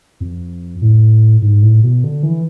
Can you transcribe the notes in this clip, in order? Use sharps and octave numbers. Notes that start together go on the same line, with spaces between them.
F2
A2
G#2
A2
B2
D3
E3